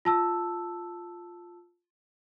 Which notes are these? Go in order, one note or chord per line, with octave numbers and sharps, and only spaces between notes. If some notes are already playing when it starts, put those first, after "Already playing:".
F4 A5 E6